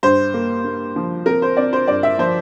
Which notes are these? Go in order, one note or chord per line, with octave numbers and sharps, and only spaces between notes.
G2 C5
A#3
A#3
F3
C4 A#4
C5
C4 D5
C5
G2 D5
E5
F3 C5